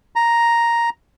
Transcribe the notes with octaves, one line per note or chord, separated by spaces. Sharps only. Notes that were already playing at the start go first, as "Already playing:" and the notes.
A#5